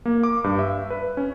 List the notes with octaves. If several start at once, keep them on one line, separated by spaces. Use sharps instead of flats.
A#3
D6
G2
E5
B4
C#4